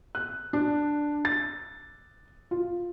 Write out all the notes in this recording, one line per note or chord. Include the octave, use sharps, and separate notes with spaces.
F#6
D4
A6
F4